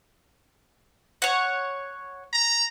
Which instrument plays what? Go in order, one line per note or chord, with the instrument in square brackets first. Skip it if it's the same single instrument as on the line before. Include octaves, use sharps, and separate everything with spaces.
[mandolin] C#5 F#5
[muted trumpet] A#5